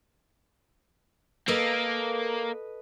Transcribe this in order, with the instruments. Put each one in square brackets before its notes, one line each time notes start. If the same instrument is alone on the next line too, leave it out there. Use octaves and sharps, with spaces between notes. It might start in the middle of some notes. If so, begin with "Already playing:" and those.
[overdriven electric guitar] A#3 [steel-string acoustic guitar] A4 B4 D#5